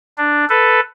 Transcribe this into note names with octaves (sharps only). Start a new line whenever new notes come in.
D4
A4 B4